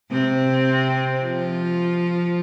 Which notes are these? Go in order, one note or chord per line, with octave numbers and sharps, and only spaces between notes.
C3 C4
F3 F4